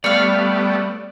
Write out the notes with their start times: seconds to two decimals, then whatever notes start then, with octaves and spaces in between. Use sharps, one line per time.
0.04 G3 A3 B3 C#5 D5 F5